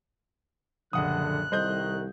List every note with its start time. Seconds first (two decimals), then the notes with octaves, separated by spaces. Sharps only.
0.93 F#1 A#2 D3 F3 F#5 D#6 F#6
1.52 C2 D#3 G3 A4 C5 D#5 G6